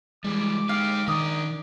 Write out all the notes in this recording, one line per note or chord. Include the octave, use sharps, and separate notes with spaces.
E3 G3 G#3 D6
D#4 G4 F5 D6
D#3 D4 A#4 D6 D#6